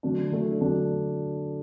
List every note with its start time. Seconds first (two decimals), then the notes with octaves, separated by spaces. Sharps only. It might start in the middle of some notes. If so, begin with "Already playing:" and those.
0.03 D3 F#3 A3 D4
0.32 D3 F#3 A3 D4
0.61 D3 F#3 A3 D4